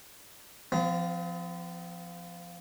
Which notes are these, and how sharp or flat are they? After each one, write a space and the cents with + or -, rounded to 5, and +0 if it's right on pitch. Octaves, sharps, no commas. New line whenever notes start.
F3 -5 C4 -45